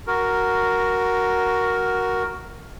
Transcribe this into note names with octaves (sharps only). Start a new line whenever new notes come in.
F#4 A#4